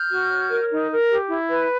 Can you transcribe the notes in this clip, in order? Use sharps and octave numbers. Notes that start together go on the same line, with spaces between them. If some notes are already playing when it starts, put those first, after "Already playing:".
Already playing: F6 G6
F#4
C#5
A#4
D#4
A#4
G4
E4
B4